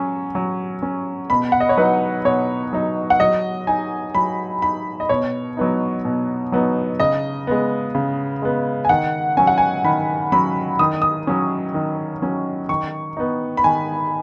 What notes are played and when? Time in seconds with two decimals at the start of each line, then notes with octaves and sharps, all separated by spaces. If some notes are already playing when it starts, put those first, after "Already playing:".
Already playing: F#3 C#4 G#5
0.35 F#3
0.83 C#4
1.30 B2 B5
1.52 F#5
1.60 D#5
1.69 C#5
1.77 F#3 D#4 B4
2.25 B2 C#5
2.73 F#3 D#4
3.10 F#5
3.20 F#3 D#5
3.67 D#4 G#5
4.15 F#3 B5
4.62 D#4 B5
5.00 D#5
5.09 B2 C#5
5.57 F#3 B3 D#4
6.05 B2
6.52 F#3 B3 D#4
7.00 C#3 D#5
7.47 G#3 B3
7.95 C#3
8.42 G#3 B3
8.85 G#5
8.89 D#3 F#5
9.37 F#3 C#4 G#5
9.47 F#5
9.58 G#5
9.84 D#3 B5
10.32 F#3 C#4 B5
10.79 D#3 D#6
11.02 D#6
11.27 F#3 C#4
11.74 D#3
12.22 F#3 C#4
12.69 D#3 C#6
13.17 B3 D#4
13.57 B5
13.64 D#3 G#5